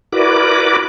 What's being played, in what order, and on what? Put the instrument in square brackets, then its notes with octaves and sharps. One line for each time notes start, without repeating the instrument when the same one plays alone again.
[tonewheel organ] E4 F#4 A#4 B4 D5 D6